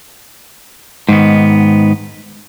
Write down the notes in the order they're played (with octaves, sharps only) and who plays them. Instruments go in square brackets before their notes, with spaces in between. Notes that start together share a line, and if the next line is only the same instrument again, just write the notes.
[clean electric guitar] G#2 D#3 B3